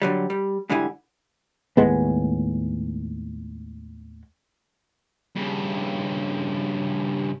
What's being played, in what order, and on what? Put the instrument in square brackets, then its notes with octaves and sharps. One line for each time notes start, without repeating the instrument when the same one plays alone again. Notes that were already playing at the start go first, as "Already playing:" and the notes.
[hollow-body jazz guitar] D3 F#3 G3
G3
G#2 D3 G3 E4 G#5
[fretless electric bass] D#2 A2 G#3 B3
[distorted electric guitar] G2 C#3